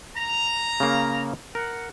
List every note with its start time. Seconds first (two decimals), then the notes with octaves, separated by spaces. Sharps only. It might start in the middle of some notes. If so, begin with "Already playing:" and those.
0.16 A#5
0.80 C#3 A#3
1.55 A#4 F#5